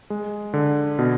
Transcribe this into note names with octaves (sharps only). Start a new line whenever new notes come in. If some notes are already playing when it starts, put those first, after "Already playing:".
G#3
D3
B2